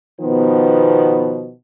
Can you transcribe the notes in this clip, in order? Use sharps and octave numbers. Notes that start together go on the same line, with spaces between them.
B2 D#3 F3 B3